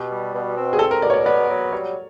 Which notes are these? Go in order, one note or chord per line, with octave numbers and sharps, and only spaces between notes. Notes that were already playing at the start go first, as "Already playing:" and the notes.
Already playing: B2 G4
G3
B2
C4
G#4
C2 A4
A#4
B2 D5
C#5
D5
B3 D5
F#3
G3 C#5